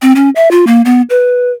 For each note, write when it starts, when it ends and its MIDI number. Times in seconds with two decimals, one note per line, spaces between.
0.02 0.12 60
0.16 0.30 61
0.36 0.51 76
0.51 0.65 65
0.67 0.82 58
0.85 1.02 59
1.10 1.51 71